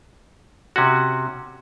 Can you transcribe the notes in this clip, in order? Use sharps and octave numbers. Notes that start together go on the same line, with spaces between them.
C3 C#4 F#4